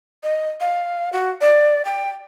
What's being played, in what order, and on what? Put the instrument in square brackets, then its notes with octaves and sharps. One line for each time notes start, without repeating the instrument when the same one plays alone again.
[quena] D#5
F5
F#4
D5
G5